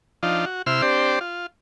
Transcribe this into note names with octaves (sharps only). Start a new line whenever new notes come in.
F3 D4 D#4 F4
F#4
C3 E4 C6 E6 F6
C4 D4 G4 C5 D5
F4